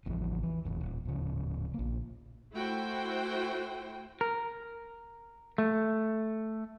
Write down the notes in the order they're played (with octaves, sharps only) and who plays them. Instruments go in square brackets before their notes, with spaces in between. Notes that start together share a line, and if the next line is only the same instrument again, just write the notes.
[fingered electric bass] A1 E2 F3
E3
F#1 E2
D#1
D1 C#3
A#1 A#3
[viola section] A3 E4 F#4 C5 G5
[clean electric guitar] A#4
A3